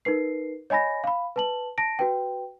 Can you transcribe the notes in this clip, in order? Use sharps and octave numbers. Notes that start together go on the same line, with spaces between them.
D#4 A#4 B4 C7
C#5 D#5 G#5 B5 A#6
F5 B5
B4 A5 F#7
A5 A#6 D7
F#4 B4 G5